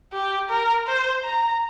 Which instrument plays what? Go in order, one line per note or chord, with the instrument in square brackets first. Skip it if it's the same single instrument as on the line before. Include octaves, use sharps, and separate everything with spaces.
[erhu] G4
A#4
C5
A#5